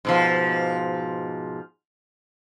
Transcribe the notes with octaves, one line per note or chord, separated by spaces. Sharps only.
G#2 B2 F3